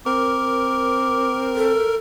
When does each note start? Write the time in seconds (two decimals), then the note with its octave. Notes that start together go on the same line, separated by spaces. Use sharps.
0.06 C4 A#4 D6
1.56 A4